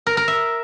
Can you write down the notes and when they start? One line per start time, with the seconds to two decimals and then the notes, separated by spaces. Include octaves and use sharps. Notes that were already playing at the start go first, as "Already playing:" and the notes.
0.07 A#4
0.17 A#4
0.28 E5